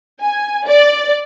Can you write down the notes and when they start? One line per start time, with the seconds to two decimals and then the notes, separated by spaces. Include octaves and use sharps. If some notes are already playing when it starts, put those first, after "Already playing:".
0.22 G#5
0.67 D5